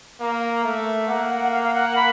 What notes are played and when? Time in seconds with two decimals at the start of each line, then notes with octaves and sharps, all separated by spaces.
0.20 A#3
0.64 A3
1.08 A#3 F#5
1.29 F#5
1.41 F#5
1.52 F5
1.64 F5
1.74 F#5
1.96 B5